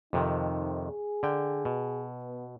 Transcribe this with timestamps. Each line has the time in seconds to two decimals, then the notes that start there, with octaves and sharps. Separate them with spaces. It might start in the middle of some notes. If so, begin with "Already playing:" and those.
0.13 F2 C3 D#3 D#4
0.87 G#4
1.23 D3 G5
1.65 B2
2.24 B3